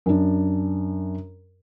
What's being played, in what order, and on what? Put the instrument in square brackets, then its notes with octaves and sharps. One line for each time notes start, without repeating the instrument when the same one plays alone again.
[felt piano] F#2 D4